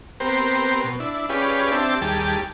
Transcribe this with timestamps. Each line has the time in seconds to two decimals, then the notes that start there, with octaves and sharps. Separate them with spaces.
0.20 B3 C4 G4 A#4 C5
0.84 B2
1.00 D4 E4
1.29 C#4 F4 G4 G#4 B4 D5
1.71 C4 D4 G4 E5 A5
2.01 D#2 G3 G4 G#4 A5